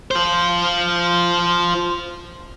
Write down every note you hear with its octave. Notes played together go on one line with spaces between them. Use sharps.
F4 C5